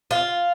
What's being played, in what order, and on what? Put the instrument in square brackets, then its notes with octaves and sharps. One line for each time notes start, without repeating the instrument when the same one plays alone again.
[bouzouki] F4